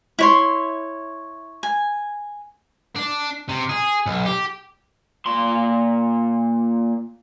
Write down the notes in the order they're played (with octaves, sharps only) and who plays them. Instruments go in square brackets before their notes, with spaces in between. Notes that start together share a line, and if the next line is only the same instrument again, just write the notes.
[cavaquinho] E4 C#5 C6
G#5
[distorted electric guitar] D4
C3
G#4
B1
G4
[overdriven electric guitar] A#2 C6